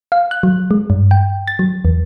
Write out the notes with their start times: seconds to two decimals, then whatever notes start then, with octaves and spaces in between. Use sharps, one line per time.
0.12 F5
0.31 F#6
0.43 F#3
0.71 G#3
0.90 G2
1.11 G5
1.48 A6
1.59 F#3
1.85 E2